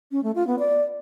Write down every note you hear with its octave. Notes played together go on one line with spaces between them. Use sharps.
C#4
A3
F4
B3
D5